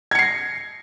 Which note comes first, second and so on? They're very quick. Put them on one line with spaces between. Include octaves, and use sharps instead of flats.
G#6 C#7 C7 A#6